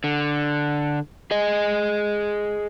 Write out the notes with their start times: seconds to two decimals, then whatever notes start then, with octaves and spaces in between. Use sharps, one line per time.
0.04 D3
1.31 G#4 D#5